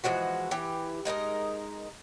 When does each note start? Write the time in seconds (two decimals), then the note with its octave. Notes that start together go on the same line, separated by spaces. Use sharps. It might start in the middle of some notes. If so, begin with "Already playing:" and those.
0.04 E3 F3 G#3 F#4
0.51 E3 G4
1.05 G#3 D#4 A#4 D#5